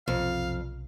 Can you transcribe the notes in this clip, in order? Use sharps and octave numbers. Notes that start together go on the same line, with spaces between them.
B1 F2 C3 F5